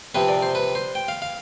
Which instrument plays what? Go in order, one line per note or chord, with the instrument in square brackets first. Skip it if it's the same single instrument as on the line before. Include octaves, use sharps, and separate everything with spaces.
[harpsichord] C3 F3 C4 B4
D5
C5
B4
C5
G5
F5
F5